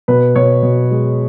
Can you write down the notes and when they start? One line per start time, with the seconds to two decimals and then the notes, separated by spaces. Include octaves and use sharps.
0.08 B2 B4
0.36 B2 C#5
0.63 B2
0.91 G#3